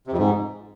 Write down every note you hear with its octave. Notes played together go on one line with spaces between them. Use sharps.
C3
F2
G#2